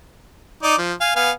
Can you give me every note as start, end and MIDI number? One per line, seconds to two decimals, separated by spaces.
0.63 0.76 63
0.63 0.76 74
0.63 0.76 86
0.78 0.93 53
1.01 1.13 77
1.01 1.13 80
1.16 1.31 59
1.16 1.31 77
1.16 1.31 80